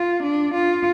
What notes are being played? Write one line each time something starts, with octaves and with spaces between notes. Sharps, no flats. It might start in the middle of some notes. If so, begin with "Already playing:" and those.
Already playing: F4
D4
F4